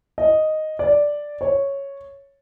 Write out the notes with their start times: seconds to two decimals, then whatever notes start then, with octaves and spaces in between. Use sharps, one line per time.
0.18 D#5
0.79 D5
1.41 C#5